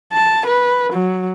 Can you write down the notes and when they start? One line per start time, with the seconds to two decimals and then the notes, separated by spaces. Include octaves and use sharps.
0.13 A5
0.46 B4
0.93 F#3